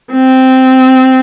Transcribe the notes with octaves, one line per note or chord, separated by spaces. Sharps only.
C4